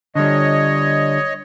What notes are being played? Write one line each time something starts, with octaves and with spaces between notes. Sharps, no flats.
D3 G3 C#5 D#5